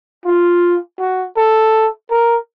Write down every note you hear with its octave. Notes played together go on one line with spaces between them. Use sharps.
F4
F#4
A4
A#4